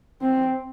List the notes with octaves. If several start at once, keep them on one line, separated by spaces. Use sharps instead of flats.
C4